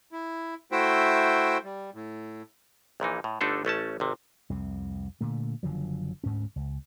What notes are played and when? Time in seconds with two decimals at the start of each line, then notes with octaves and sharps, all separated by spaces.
0.12 E4
0.72 A3 E4 F#4 C5 E5 G5
1.63 G3
1.94 A2
3.00 A#1 A#2 E3 D#4
3.24 A2
3.41 G1 D3 A3 D4 D#4 A4
3.65 A1 A3 C#4 A5
4.00 G#1 C3
4.50 C2 F2 C3
5.21 A#2 D3 A3
5.63 F#1 D3 F3 F#3
6.24 D2 G#2 C#4
6.56 C#2